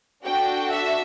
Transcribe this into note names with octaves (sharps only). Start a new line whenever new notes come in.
D4 F#4 A4 G5
E5